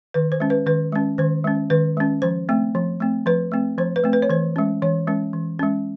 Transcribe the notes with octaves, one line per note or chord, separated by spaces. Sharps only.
D#3 B4
C5
G#3 C#4
B4
D#3 B4
G#3 C#4
D#3 C5
G#3 C#4
D#3 B4
G#3 C#4
F3 C5
A3 C4
F3
A3 C4
F3 B4
A3 C4
F3 C5
B4
A3 C4
B4
C#5
E3 C5
G#3 C#4
E3 C#5
G#3 C#4
E3
G#3 C#4